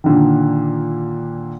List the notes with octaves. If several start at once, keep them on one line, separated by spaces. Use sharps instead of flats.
A#2 D3 D#3